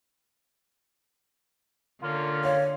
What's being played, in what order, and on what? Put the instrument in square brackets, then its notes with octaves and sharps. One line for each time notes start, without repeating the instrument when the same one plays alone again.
[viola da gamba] D3 [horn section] A#3 C#4 F4
[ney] C#5 [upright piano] F5